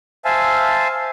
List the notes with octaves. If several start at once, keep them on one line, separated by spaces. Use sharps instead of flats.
C5 E5 F5 G#5 A5